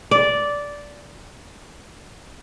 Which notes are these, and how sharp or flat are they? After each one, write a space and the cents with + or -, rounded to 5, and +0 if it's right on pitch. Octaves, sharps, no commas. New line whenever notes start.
D5 -10